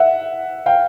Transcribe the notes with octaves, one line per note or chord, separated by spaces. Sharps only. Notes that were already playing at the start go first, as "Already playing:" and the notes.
Already playing: E5 F#5
F5 G5